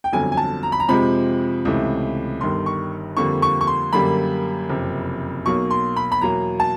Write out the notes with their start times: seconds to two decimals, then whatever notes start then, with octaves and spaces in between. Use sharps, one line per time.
0.04 G5
0.12 G1 F2 D3 F#3 G#5
0.32 G#5
0.37 A5
0.63 A#5
0.72 B5
0.80 A#5
0.88 F2 C3 F3 G#3 B5
1.65 C#2 C3 E3 A3
2.41 G1 G2 D#3 G3 C6
2.66 C#6
3.17 F2 D3 G3 A#3 C#6
3.42 C#6
3.61 C#6
3.67 C6
3.93 F#2 D3 G3 A#3 B5
4.69 F#1 F2 C3
5.46 B1 B2 F#3 A#3 C#6
5.71 C6
5.96 B5
6.12 B5
6.21 E2 B2 F#3 A#3 A#5
6.60 A5